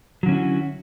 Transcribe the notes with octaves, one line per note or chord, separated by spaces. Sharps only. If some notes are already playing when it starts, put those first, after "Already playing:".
D3 F#3 C#4 E4 F#4